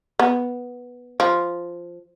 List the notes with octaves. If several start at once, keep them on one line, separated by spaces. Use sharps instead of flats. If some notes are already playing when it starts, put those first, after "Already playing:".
B3
F3